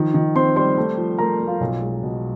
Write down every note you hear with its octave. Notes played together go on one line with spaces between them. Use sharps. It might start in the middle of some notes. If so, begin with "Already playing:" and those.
Already playing: D#3 F3
D#3
C4 C5 C6
G3 C5 C6
A3
F3
A3 A#4 A#5
A3
F4 F5
B1
G#3
B2